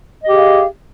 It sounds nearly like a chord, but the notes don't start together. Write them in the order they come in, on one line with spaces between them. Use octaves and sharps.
D#5 G4 G#4 F5